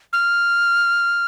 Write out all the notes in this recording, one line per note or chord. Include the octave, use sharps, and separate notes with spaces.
F6